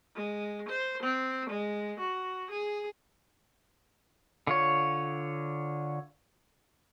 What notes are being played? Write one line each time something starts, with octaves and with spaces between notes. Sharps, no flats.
G#3
C5
C4
G#3
F#4
G#4
D3 F4 C#5